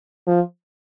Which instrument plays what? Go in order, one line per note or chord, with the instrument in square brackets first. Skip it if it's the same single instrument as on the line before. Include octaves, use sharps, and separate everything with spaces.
[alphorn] F3